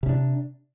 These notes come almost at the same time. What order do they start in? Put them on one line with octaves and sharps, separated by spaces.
C3 C#4 D4